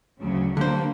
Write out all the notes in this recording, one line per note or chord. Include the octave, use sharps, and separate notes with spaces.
D2 C#3 F#3
D3 F#3 G3 A#3 D4 C5